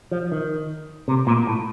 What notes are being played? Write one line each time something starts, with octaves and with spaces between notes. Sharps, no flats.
F3
D#3
C3
A#2
A2